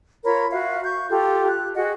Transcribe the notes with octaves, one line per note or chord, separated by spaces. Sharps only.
F4 A#4 C#5 B5
F#4 E5 F5
C#6 G6
F4 G4 A4
F#6
F#4 G#4 D#5 F#5